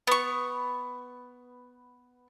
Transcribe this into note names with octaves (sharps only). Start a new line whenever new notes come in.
B3 C#6